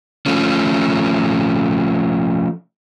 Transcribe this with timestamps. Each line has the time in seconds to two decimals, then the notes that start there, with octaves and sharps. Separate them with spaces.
0.26 F3 A3 C#4